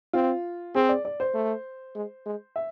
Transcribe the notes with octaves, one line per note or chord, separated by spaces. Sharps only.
C4 F4
C4 G#4
D5
D5
C5
A3
G#3
G#3
E5